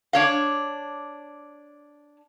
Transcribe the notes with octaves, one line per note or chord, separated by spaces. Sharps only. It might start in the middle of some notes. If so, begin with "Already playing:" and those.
D4 C#5 F5